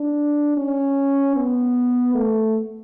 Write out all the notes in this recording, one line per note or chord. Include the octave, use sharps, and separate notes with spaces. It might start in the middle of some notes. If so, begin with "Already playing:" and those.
Already playing: D4
C#4
B3
A3